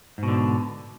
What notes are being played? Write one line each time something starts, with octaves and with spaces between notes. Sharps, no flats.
G#2 B2 D3